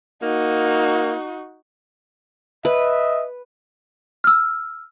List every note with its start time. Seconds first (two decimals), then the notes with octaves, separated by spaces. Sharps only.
0.22 A#3 D#4 F#4
2.65 B4 D#5 E5
4.24 E6 F6